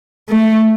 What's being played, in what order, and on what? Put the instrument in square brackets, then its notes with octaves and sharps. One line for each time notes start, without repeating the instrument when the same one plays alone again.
[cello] A3